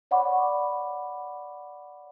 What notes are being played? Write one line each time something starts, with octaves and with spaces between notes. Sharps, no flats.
C#5 D5 F#5 B5 C#6 D6